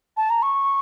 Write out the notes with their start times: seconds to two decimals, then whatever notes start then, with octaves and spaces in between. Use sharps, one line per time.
0.17 A5
0.30 A#5
0.43 C#6